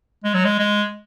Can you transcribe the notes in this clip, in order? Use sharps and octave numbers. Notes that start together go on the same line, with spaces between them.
G#3
F#3
G#3
G#3